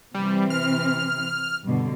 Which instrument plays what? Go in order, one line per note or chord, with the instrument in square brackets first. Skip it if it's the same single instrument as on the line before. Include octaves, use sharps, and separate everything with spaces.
[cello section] C3 E3 C4 [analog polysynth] G3
[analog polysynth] F6
[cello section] G2 B2 D3